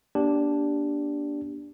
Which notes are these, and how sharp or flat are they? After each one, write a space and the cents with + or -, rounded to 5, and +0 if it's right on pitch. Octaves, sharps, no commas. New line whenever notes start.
A#3 +45 D4 -10 G4 +0